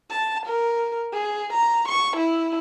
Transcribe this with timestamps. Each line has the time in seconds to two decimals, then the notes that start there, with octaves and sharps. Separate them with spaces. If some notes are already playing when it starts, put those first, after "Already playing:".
0.10 A5
0.46 A#4
1.13 G#4
1.53 A#5
1.88 C#6
2.17 E4